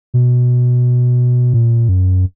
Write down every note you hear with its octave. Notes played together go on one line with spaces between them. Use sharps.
B2
A#2
F#2